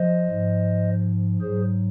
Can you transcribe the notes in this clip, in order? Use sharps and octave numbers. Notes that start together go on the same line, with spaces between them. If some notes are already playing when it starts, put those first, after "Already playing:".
Already playing: F3 C5 D#5
G#2 F3
G#2 F#3 G#4 C5